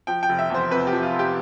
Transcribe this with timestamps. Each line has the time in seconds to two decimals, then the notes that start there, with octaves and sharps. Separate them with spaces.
0.07 F3 G5
0.23 G5
0.29 F1
0.39 E5
0.50 E2 C5
0.71 C3 B4
0.87 G4
0.92 F3
1.03 F4
1.14 F1
1.19 G4